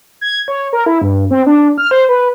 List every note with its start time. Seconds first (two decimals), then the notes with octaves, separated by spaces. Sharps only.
0.21 G#6
0.48 C#5
0.73 A#4
0.86 E4
1.02 G2
1.31 C4
1.46 D4
1.78 F6
1.91 C5
2.09 B4